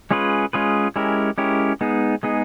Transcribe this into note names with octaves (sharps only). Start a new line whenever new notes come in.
G#3 C#4 F4 G#4 B4
G#3 C#4 F4 G#4 B4
G#3 C#4 E4 G4 A#4
G#3 C#4 E4 G4 A#4
G#3 B3 D#4 G#4
G#3 B3 D#4 G#4